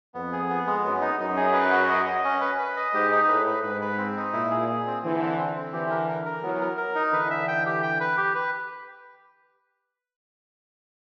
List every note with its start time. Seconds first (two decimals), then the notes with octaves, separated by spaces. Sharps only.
0.14 F2 B3
0.32 G#4
0.50 B3
0.67 G#3
0.84 F#2 B3
1.01 D#4
1.18 F#2 D#4
1.37 G#4
1.54 B4
1.71 F#4
1.89 D#5
2.06 D#5
2.24 C#4
2.41 B4
2.58 B4
2.77 D#5
2.93 G#2 G4
3.12 D#4
3.28 A2 B4
3.46 B4
3.63 G#2 B4
3.81 B4
3.98 C4
4.16 D#4
4.33 A#2 E4
4.51 G#4
4.69 G#4
4.86 C4
5.03 D3 E3 C4
5.21 C4
5.38 C4
5.56 C4
5.73 D3 E3 G4
5.90 A#4
6.08 A#4
6.25 A#4
6.42 E3 F#3 B3
6.61 A#4
6.77 A#4
6.95 D#4
7.12 D3 E3 B4
7.30 E5
7.48 G5
7.66 G4
7.83 G5
8.00 B4
8.17 G4
8.35 B4